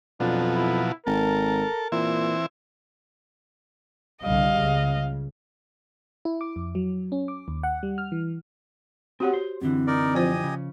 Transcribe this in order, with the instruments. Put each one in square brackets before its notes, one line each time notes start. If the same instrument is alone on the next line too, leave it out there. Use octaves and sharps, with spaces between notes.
[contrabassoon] F2 [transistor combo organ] B2 F3 F#3 [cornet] D4
[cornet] E4
[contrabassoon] G#1 [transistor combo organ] A4 [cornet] A#4
[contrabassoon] A#2 [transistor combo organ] E3 C4 E4
[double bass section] C2 D3 G3 [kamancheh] D#5 F5
[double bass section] C#2 C#3
[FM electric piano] E4
D6
F2
F#3
C#4
D6
D#2
F#5
G3
F6
E3
[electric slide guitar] C4 F#5 [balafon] F#4 G4 C#5
[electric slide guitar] C5
[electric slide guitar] F#2 D3 E3 [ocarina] C4
[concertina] D#4 A#4 D5
[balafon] F3 F4 C5 [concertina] G4 D#5 G#5
[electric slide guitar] C#3